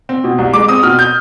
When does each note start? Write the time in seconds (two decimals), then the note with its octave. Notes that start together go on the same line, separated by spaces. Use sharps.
0.09 C4
0.24 B2
0.38 C2
0.53 G#3 D6
0.68 C4 D#6
0.83 B2 F6
0.99 G6